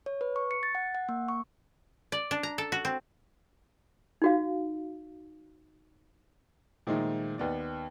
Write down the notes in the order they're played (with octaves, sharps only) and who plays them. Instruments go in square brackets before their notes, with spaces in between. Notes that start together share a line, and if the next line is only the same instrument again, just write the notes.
[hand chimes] C#5
B4
C#6
C#7
A6
F#5
F#5
A#3
C#6
[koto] D5
D4
A#5
A4
F#4
C4
[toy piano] D#4 F#4 F5
[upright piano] A#2 D#3 F3 G#3 A3 D#4
D#2 B3 D5